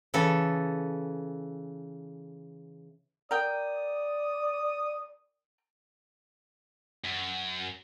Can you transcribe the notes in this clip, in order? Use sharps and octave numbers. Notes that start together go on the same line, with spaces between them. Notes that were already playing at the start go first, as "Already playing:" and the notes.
C#3 E3 A4
A#4 D5 G5 D#6
F#2